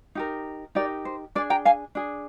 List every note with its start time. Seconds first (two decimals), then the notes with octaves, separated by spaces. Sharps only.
0.15 D#4 G4 A#4
0.75 D#4 G4 A#4 D5
1.05 C5
1.35 D4 G#4 D5
1.50 G5 A#5
1.65 F5 G#5
1.95 D4 G#4